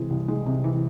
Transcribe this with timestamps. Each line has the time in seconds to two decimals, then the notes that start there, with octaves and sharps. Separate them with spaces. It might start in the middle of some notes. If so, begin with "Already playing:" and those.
Already playing: C3 E3 G#3
0.10 C2
0.28 G#3
0.46 C3
0.64 E3